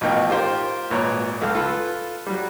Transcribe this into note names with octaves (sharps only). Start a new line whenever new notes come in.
A1 B2 F3 D#4 A#4 G5
F4 G4 A#4 C5
G#1 A#2 B4 C#5 A#5
C#2 A4 F5 F6
F4 A4 B4
F#3 G3